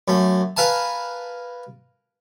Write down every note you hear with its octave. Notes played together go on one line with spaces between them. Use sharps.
F#2 A3
A#4 B4 F5 G#5 A5